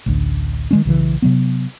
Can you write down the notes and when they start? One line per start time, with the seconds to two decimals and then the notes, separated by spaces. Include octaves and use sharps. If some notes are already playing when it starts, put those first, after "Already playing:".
0.06 A1 D2
0.71 D#3 G#3 C#4
0.85 B1 C#3 E3
1.22 C3 F#3 B3